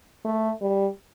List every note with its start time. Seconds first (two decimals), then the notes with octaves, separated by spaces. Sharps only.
0.25 A3
0.61 G3